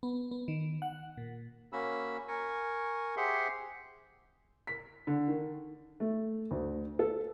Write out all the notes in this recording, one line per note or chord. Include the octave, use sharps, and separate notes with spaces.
B3
B3
D#3
F#5
A#2
A#3 C#4 F#4 B5 E6
A#4 G#5 C#6
G4 G#4 C5 E5 F#5 C6
B6
D3
D#3
A3
D2
A4